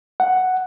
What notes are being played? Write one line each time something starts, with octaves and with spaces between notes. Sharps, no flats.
F#5